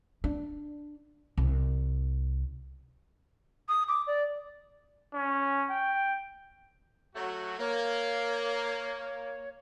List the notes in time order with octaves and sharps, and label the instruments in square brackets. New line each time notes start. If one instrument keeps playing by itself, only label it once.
[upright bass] D4
C2
[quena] D#6
D6
D5
[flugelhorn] C#4
G5
[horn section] F#3 A3 F#4
[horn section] A#3 [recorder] C#5